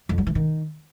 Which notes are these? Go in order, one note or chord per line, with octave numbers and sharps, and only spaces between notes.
F2
F#3
E3
D#3